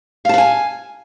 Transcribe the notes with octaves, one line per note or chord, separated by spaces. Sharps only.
F5 F#5 G#5 A5